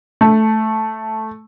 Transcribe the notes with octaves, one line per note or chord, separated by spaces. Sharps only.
A3